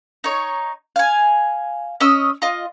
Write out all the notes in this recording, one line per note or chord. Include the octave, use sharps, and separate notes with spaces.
D#4 C#5
F5 G#5
C#4 D#5 E6
F4 D#5